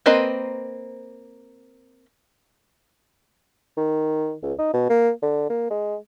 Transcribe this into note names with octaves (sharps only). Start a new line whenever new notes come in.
A#3 C4 B4 C5 D#5
D#3
C#2
D#4
B2
A#3
D3
A#3
G#3